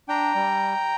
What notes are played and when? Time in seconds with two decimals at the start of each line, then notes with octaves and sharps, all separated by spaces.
0.08 D4 G5 A#5
0.35 G3